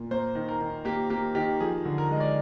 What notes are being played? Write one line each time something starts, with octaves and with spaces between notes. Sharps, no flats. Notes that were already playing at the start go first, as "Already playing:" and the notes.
Already playing: A#2
A#3 C5
D#3
A#4
D#3
A#3 G4
A#3 G4
D#3 G4
F3 G#4
D3
A#4
G#3 D#5
D5